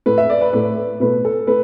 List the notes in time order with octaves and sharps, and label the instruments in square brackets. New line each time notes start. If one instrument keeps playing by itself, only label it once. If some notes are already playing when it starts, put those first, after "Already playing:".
[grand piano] A2 A3 B4
E5
D5
B4
A2 A3 B4
B2 A3 B4
A4
A3 B4